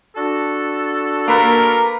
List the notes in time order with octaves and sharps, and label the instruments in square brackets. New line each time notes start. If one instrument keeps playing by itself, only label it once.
[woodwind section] D4 F#4 A4
[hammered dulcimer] A#3 B4 [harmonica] A#4